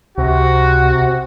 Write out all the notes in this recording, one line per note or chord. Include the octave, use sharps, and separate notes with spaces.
C#2 C3 F#4